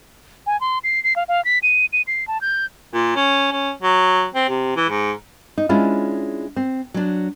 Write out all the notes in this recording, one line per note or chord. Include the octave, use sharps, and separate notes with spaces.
G#5
C6
C7
C7
F5
F5
B6
D#7
D#7
C7
A5
G6
A#2
C#4
C#4
F#3
C4
C3
E3
G#2
D#4
G#3 C#4 D4 E4 F4
C4
F#3 D4